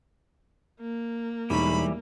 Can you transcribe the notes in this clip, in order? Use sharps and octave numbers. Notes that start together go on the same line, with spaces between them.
A#3
E1 E3 G3 D#4 B5 C#6